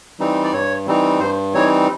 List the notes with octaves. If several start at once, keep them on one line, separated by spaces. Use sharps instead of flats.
E3 G3 C4 D#4
D5
G2 C#5
E3 G3 C4 D#4
G2 C5
E3 G3 C4 D#4 C#5